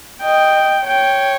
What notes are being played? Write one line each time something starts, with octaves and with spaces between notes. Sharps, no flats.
D#5 G5
C#5 G5